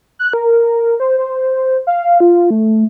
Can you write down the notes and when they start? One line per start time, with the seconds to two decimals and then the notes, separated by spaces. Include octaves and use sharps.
0.19 F#6
0.33 A#4
1.00 C5
1.18 C5
1.87 F5
2.20 F4
2.50 A3